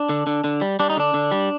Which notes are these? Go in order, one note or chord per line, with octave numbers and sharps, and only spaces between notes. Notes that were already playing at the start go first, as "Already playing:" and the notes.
Already playing: D4
D3
D3
D3
G3
G3 D4
D#4
D3 D4
D3
G3